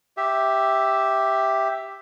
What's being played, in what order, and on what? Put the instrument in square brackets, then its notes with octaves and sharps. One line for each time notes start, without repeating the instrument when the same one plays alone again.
[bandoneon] G4 E5